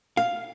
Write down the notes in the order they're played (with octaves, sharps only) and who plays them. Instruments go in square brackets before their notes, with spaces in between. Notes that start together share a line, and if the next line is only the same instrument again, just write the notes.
[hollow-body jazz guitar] F5